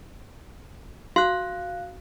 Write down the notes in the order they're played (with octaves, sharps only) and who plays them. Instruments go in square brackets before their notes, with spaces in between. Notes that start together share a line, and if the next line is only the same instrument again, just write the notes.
[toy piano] F#4 [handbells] F5 F#6